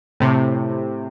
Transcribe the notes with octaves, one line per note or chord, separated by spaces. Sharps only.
A2 C3